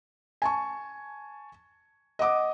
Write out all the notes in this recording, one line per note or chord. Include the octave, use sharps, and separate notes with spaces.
G#5 A5 C#6
D#5 F#5 D6 D#6